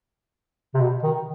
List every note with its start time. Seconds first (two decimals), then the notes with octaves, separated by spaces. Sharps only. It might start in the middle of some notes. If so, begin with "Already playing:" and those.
0.74 C3
0.80 B2
1.03 D#3